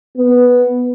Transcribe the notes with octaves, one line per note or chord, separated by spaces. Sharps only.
B3